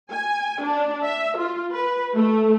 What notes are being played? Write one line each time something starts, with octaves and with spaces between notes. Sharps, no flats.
G#5
D4
E5
F4
B4
A3